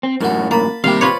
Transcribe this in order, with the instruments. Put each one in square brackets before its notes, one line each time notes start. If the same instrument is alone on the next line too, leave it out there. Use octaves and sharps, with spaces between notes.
[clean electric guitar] C4
[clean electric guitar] F#2 A2 [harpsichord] F#4 A#4
[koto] A#3 [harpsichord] A5 B5
[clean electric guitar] C3 G4 [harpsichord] D#3 G3 A#3 [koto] F5
[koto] F4 B4 C#5 [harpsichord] D5 B5